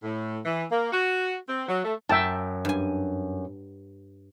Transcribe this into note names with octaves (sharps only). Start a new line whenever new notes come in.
A2
E3
A#3
F#4
C4
F#3
A3
F#2 E5 G5 A5
G2 G#5